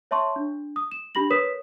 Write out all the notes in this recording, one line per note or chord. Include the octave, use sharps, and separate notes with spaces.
C#5 E5 A5 C6 C#6
D4
D#6
E7
D4 G4 B5 A#6 F#7
A#4 B4 C#5 D#6 B6 E7